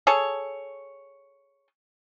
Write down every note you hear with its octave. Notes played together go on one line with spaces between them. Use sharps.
G#4 A4 C#5